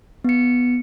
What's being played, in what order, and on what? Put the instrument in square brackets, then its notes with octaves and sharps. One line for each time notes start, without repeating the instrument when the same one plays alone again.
[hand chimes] B3 C#7